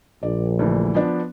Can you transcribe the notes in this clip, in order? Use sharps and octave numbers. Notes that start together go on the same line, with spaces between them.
A#1 D5
D2 D3 E3
F3 B3 D4